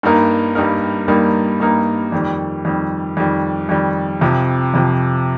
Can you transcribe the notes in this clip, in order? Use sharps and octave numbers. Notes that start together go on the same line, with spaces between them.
G2 G3 A#3 D#4 A#4
G2 G3 A#3 D#4 A#4
G2 G3 A#3 D#4 A#4
G2 G3 A#3 D#4 A#4
F2 D#3 G3
F2 D#3 G3
F2 D#3 G3
F2 D#3 G3
F2 C3 F3
F2 C3 F3